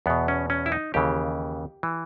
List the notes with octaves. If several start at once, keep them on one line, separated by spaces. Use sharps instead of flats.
E2 B2 B3
C#4
C#4
E4
D#4
D#2 C#3 E3 G4
E3